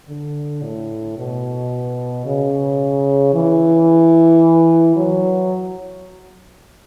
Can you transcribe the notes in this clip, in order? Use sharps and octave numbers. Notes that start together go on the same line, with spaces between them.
D3
A2
B2
C#3
E3
F#3